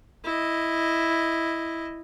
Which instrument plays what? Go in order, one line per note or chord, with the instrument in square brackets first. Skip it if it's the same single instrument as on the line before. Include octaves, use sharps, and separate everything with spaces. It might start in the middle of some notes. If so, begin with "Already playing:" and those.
[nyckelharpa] E4 D#5